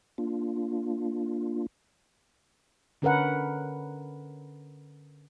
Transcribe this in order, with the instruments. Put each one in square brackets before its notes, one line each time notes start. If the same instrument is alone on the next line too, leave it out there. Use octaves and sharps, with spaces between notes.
[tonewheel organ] A#3 D4 F4
[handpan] D3 C#4 A#4 B4 F#5